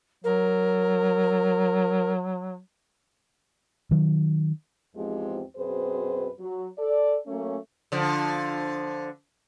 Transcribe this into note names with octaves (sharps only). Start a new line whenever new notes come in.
F#3 A#4
D#3 F#3
E2 G#2 F3 G#3 C4 G4
F#2 B2 C4 G#4 B4 C5
F#3
A4 D5
F#3 A3 A#3 C#4
D3 F3